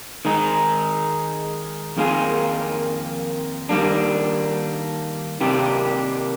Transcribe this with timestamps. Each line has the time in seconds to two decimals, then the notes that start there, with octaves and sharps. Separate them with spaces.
0.25 D#3 G#3 D#4
1.97 F2 D#3 A#3 F4 G#4
3.69 D#3 G3 A#3 D4
5.41 C3 D#3 A#3 D4 G4